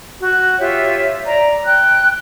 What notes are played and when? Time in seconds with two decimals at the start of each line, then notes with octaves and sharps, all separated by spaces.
0.22 F#4
0.59 F4 G4 C#5 E5
1.25 D5 A#5
1.66 G5 F#6